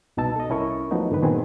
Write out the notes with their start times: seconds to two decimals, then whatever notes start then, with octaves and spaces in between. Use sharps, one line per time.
0.17 C2 B2 D#4 A5 E6
0.36 A4 D#5
0.49 C2 C#4 E4 A#4 C#6
0.91 F3 F#3 A3 B3 D#4
1.11 G2 D3 D#3 B4
1.22 A#2 D#3 F#3 B3 C4 G#4